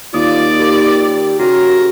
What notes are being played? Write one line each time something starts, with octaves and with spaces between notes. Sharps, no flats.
D#2 F4 D5 D#6
G4 A#4
C#3 F#4 A#4